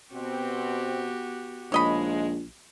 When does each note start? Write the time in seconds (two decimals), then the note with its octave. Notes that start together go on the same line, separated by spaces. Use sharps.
0.13 B2 B3 C4 F#4 G4
1.72 A#1 D#3 F3 G#3 C#5 D#5 B5